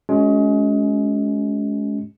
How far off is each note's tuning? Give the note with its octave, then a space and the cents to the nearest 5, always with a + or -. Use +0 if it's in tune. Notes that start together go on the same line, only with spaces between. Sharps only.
G#3 +30 C#4 +20 F#4 +0